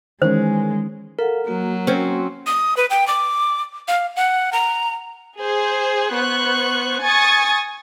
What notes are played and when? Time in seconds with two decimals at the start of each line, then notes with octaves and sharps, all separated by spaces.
0.22 D#3 E3 G#3 C#4 C5
1.19 A4 A#4 F5 F#5
1.47 F#3 A#3 F#4
1.87 C4 C#4
2.47 D#6
2.77 B4
2.90 G5
3.07 D6
3.88 F5
4.16 F#5
4.53 A#5
5.40 G#4 C5
6.11 B3 C5 C#6 F#6
7.02 G#5 C#6 D#6 A6